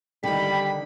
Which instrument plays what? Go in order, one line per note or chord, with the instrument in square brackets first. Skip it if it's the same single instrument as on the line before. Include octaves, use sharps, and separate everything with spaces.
[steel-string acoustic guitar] D3 D#3 [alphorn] G3 [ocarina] G5 [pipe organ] B5